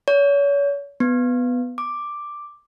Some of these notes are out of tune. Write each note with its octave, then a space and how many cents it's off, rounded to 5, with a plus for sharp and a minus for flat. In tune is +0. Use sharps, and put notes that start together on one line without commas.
C#5 +35
B3 +5
D6 +5